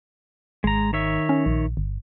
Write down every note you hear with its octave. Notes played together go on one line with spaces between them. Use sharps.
G#1 G#3 A#5
D#3 C#5 E5
C#4
A#1
G1